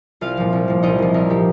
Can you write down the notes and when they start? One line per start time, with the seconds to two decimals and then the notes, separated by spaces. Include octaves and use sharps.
0.21 C2 F4 F5
0.37 A#2 F3
0.53 C2
0.68 A#2 F3
0.83 C2 D#4 D#5
0.98 A#2 F3
1.14 C2 A#4
1.29 A#2 F3 G4